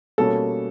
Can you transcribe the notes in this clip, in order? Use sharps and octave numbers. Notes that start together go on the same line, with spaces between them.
B2 G3 A#3 C#4 A4